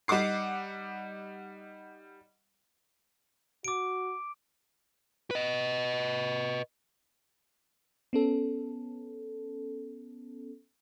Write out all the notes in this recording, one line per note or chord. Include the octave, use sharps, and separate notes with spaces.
G3 D#4 F#5 D6 C7
F#4 D6 D7
B4 D#5
B3 C#4 A4